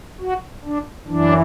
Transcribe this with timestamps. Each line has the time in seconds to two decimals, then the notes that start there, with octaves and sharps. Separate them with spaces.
0.20 F#4
0.65 D4
1.07 F#2 E3 D4